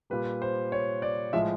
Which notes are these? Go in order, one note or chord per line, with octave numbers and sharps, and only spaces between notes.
A#2 G3 B4
C5
C#5
D5
A2 F3 G#3 E5